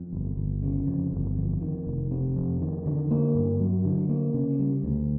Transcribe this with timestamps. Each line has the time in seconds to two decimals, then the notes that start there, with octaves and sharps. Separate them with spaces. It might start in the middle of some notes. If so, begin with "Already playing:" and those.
Already playing: F2
0.13 G1
0.37 G1
0.63 C#3
0.87 F2
1.13 G1
1.36 F2
1.61 D#3
1.87 F1
2.11 C3
2.36 F2
2.61 D#3
2.86 D3
3.11 A#3
3.35 G2
3.60 F#3
3.85 D3
4.09 A#3
4.34 C#3
4.59 G3
4.83 D2